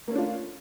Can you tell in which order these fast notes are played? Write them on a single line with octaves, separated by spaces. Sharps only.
A#3 C#4 A3 D4 F4